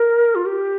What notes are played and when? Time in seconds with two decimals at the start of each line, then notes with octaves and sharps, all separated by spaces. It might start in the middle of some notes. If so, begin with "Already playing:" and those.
Already playing: A#4
0.35 F4
0.46 G4